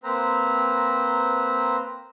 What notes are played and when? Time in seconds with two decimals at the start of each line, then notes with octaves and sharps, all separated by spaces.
0.04 A#3 C4 B4 C5 A#5